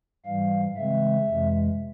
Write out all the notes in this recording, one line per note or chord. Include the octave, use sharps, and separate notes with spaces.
G#2 E3 G3 F5
C#3 E3 G#3 C4 E5
F2 C3 E3 G#3